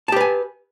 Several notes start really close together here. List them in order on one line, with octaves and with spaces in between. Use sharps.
A5 G4 B4 G#5